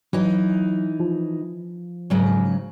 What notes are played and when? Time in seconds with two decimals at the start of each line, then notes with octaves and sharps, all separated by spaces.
0.13 E3 F#3 D#4
1.00 F3
2.10 G#2 C#3 F#3